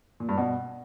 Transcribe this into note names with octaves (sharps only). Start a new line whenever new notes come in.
A#2
G2
B2